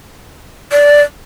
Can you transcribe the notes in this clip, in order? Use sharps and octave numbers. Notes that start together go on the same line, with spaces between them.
D5